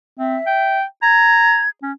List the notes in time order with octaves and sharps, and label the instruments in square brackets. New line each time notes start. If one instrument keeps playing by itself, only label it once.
[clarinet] C4 [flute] E5
[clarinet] G5
[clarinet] A#5 [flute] G#6
[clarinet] C#4